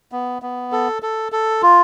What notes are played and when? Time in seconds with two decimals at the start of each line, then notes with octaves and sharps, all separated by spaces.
0.12 B3
0.42 B3
0.72 A4
1.03 A4
1.32 A4
1.62 F4